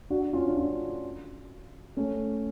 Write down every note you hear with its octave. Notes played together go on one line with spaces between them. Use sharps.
D4 F#4
C#4 F4
D4
C#4 F4
A3 C#4